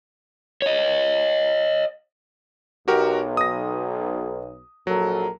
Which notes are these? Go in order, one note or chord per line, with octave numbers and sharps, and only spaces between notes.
C#5 D#5
B1 F#4 G4 A#4
D#6 A#6
A#1 F#3 A4 A#4